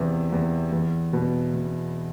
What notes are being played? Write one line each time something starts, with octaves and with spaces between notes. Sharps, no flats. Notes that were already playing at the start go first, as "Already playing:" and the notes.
Already playing: E2 C3
E2
E2
B2
B2